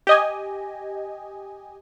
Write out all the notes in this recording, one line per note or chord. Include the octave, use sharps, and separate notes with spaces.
G4 D#5 G#5